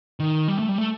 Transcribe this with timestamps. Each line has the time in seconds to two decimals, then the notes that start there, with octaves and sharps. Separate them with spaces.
0.20 D#3
0.48 G3
0.59 A3
0.69 G3
0.78 A3